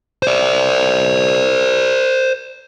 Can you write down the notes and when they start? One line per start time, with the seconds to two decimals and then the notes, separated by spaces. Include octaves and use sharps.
0.23 C5 D5